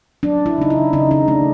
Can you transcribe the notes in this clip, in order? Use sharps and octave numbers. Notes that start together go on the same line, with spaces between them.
F#3 D4
E4
C#3 D#4
E4
C#3 D#4
D#4
A3 D4